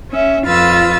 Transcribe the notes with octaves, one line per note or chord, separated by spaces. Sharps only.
C#4 E5
F2 F4 B4 F5 E6 A6